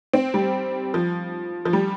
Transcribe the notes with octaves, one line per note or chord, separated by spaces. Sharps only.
C4
G3
F3
F3
G3